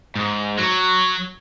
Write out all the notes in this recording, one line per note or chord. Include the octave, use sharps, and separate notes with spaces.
G#2
F#3